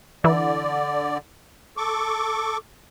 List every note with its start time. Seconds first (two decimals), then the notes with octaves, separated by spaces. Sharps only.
0.24 D3 E3 E4 D5
1.77 A4 C#6 D6